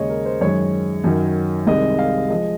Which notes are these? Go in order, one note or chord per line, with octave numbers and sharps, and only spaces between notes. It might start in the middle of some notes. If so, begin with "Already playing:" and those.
Already playing: D#2 C#3 G#3 C#5 D#5
A#4
C5
F#2 D#3 G#3 C#5
F#2 D#3 F#3
C2 C3 D#3 G#3 D#5
F5
F3 G#3 D#5